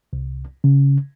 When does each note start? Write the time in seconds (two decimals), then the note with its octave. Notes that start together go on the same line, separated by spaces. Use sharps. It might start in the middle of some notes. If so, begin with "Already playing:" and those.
0.13 C2
0.64 C#3